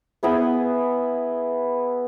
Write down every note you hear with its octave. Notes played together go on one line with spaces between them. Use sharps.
B3 E4 G#4 B4